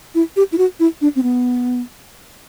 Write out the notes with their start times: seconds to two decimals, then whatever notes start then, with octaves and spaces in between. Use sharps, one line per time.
0.15 E4
0.36 G4
0.52 E4
0.58 F#4
0.80 E4
1.01 D4
1.16 C4
1.23 B3